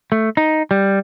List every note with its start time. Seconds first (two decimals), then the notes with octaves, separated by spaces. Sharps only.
0.12 A3
0.37 D#4
0.71 G3